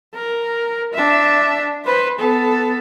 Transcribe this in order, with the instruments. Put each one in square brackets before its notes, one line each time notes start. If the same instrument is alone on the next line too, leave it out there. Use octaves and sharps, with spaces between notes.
[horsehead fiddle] A#4
D4 E5
B4 C5
B3 A4